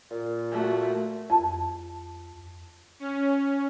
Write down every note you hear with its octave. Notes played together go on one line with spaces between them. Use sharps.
A#2
A3 F#4
F2 A5
C#4